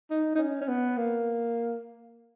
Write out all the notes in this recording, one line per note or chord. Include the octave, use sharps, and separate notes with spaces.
D#4
D#4
C#4
C#4
B3
A#3